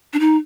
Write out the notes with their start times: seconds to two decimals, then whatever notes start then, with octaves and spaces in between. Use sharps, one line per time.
0.13 D4
0.20 D#4